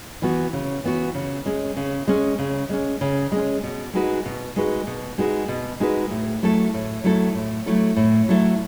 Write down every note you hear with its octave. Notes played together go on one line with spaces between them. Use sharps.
E3 B3 F#4
C#3
E3 B3 F#4
C#3
G#3 C#4
C#3
G#3 C#4
C#3
G#3 C#4
C#3
G#3 C#4
B2
G#3 D#4 F#4 B4
B2
G#3 D#4 F#4 B4
B2
G#3 D#4 F#4 B4
B2
G#3 D#4 F#4 B4
A2
F#3 A3 E4 A4
A2
F#3 A3 E4 A4
A2
F#3 A3 E4 A4
A2
F#3 A3 E4 A4